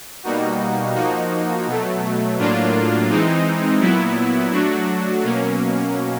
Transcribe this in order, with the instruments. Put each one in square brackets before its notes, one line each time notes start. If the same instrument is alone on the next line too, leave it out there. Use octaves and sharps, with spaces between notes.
[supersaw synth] B2 G3 A#3 D#4 F#4
F3 A#3 D#4 F#4
B2 F#3 A3
A2 F#3 A#3 D4 F4
E3 G#3 C4 D#4
A#2 F#3 B3 E4
F#3 A3 D4 F#4
B2 F#3 A#3 C#4